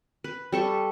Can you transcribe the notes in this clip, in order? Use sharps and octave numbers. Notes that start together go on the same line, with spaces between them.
B4
G3 A4 C#6